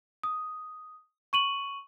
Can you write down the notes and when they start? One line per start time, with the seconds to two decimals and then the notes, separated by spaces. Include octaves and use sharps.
0.23 D#6
1.33 C#6 D#7 F#7